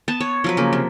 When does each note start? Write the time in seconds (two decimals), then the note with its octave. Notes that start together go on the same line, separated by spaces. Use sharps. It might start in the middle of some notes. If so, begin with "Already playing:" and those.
0.08 B3 A5
0.20 C#5
0.44 F3 F#3 B4
0.57 C#3 A#3
0.73 C3